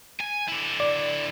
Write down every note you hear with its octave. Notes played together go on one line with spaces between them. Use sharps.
G#5
D3 E4
D5